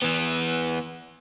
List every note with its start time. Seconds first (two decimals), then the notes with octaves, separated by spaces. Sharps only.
0.02 E3 B3